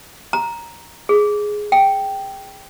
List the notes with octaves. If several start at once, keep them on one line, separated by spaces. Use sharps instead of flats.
A#5
G#4
G5